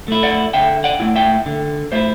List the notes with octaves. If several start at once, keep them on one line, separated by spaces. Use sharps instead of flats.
A3 E4
D5 F#5
D3 E5 G5
D5 F#5
A3 E4
E5 G5
D3
A3 E4 C5 E5